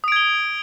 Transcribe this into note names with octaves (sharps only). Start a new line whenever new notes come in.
D#6 G#6 D7 G7